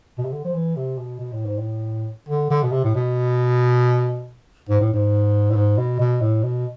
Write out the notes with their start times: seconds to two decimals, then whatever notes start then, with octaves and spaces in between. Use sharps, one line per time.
0.18 B2
0.25 C3
0.32 D3
0.45 F3
0.54 E3
0.76 C3
0.98 B2
1.20 B2
1.32 A2
1.46 G#2
1.58 A2
2.29 D3
2.50 D3
2.64 B2
2.72 C3
2.84 A2
2.95 B2
4.69 G#2
4.81 A2
4.93 G#2
5.51 A2
5.56 G#2
5.78 B2
6.00 B2
6.21 A2
6.43 B2